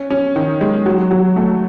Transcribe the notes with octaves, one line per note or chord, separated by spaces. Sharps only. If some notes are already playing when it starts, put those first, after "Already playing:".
Already playing: C#4
C#4
D#3
G#3
F#3
F#3
A3